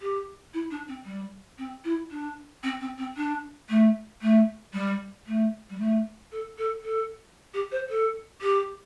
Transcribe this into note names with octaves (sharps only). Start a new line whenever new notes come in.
G4
E4
D4
C4
G3
C4
E4
D4
C4
C4
C4
D4
A3
A3
G3
A3
G3
A3
A4
A4
A4
G4
C5
A4
G4